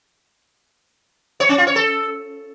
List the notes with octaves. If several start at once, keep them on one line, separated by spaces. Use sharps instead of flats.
C#5
C#4
F4
C#5
A4